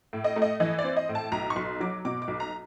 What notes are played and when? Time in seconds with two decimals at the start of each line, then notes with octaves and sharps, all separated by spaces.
0.13 A2
0.24 D#5
0.36 A3
0.42 D#5
0.60 E3 D#5
0.79 D5
0.84 C4
0.97 D#5
1.09 A2
1.15 A5
1.32 B1 A#5
1.50 C#6
1.56 B1 C6
1.80 F#3 D6
2.05 B2 D6
2.22 D6
2.28 B1
2.40 A#5